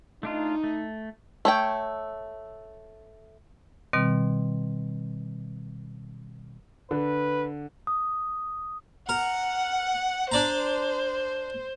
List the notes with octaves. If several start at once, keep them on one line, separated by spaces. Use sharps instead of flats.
A3 D4 D#4 F4
A3
A3 C#5 G5
B2 D#3 G3 C4
D3 B4
D#6
A#4 F#5
D4 C5 D5 A#5